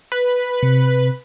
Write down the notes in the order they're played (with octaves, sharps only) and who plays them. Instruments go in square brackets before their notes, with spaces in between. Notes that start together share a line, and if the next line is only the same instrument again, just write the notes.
[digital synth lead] B4
[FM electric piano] C3